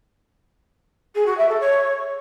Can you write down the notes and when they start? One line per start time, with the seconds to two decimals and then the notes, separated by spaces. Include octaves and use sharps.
1.15 G#4
1.26 F#4
1.37 E5
1.48 A4
1.60 C#5